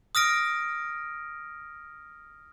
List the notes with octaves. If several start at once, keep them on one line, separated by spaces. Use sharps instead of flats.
D#6 F6 A#6 D7